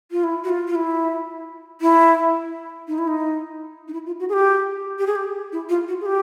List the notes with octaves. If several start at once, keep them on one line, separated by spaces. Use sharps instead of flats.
F4
E4
F#4
F4
F4
E4
E4
D#4
E4
D#4
D#4
E4
F4
F#4
G#4
G4
G4
G#4
G4
E4
F4
F#4
G#4
G4